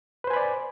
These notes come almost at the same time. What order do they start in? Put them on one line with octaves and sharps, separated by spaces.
B4 C5 G#5 B5 D5